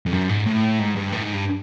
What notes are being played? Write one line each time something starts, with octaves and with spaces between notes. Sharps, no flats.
F2
F#2
G#2
A2
G#2
G2
A2
G#2
G2